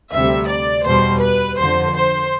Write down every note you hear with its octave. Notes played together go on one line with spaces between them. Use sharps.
D2 C3 G3 E5
D5
E2 B2 G3 C5
B4
F2 D3 F3 C5
C5